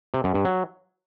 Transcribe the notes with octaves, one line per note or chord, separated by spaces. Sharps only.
C3
F#2
G2
F#3